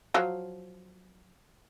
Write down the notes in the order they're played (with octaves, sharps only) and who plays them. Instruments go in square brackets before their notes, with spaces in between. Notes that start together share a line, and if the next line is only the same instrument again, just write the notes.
[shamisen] F3 F#3